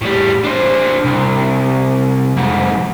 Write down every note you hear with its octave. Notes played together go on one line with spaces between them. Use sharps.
A2 G3
D4 C5
C2
F2 G#2